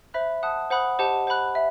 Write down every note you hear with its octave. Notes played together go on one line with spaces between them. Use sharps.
C5 E5 B5 F#6
F#5 A5 D#6 F#6
C5 F#5 B5 D#6 F#6
G4 C5 D#5 F#5 A5
C5 F#5 B5 F#6
E5